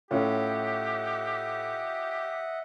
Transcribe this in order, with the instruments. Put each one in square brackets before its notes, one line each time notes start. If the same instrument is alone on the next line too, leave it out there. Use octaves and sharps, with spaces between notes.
[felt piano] A2 C#4 [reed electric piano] F4 [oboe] G4 [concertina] D#5 E5 F#5